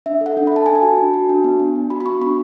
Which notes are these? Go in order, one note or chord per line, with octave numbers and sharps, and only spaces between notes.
D4 E5
A4
F#5
D4
B5
A4 A5
D4 G#5
A5
F#4
D4
F#4
D4
B3
D4
B3
F#4 B5
B5
B3 C#6
D4 B5